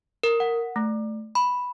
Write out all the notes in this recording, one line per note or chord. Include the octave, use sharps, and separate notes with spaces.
A#4
F#5
A3
B5